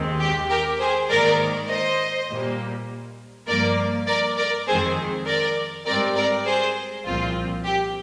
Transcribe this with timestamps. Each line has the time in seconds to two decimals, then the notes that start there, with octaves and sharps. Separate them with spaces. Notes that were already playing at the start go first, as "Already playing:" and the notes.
Already playing: D#2 D#3 G#3 C4
0.20 G4
0.50 G4 A#4
0.79 G#4 C5
1.09 G#2 D#3 A#3 A#4 D5
1.69 C5 D#5
2.29 A#2 G3 A#3
3.48 G2 F3 A#3 A#4 D5
4.07 A#4 D5
4.37 A#4 D5
4.66 F2 D#3 G#3 C4 G#4 C5
5.27 A#4 D5
5.85 G#2 G3 C4 A#4 D5
6.16 A#4 D5
6.45 G#4 C5
7.04 C2 A#2 F3 C4 F4
7.65 G4